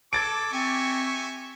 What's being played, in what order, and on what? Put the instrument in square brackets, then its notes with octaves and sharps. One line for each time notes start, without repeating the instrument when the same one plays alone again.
[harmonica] A4 D6 [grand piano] G#6 A6 D7
[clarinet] C4 [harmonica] G4 E5 G#5 [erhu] C#6